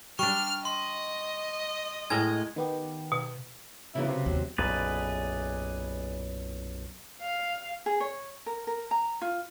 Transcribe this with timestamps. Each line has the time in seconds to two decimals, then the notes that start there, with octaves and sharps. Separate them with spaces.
0.19 G3 D4 C#6 F6
0.65 D#5 C6
2.10 A2 G#3 A#4 G#6
2.56 D#3 B3 G4
3.12 B2
3.95 G#2 C#3 E3 F#3 B3 E4
4.07 C3
4.26 D#2 F#3
4.58 B1 F#2 A#2 G#4 B4 D5
7.22 F5
7.86 G#4
8.00 C#5
8.46 A#4
8.67 A#4
8.91 A#5
9.22 F4